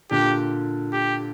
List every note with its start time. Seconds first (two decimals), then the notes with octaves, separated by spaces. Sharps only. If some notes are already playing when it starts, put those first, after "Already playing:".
0.11 A#2 D3 G4
0.93 G4